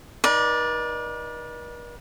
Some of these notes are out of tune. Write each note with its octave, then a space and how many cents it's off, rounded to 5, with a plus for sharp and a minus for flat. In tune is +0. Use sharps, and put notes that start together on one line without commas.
D#4 +0 B4 -45 D5 +0